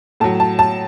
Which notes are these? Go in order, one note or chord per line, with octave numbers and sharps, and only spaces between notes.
A2 F#3 A5
A5
A5